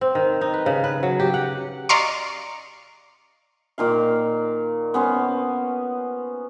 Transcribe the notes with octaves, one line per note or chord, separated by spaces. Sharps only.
C4
D#3
D#4
B4
C#3
B4
F#3
G4
F#5
D5 D#5 F5 A#5 C6 C#6
A#2 D#3 F5
B3 C#4 C5